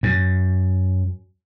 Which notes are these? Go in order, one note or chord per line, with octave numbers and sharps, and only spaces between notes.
F#2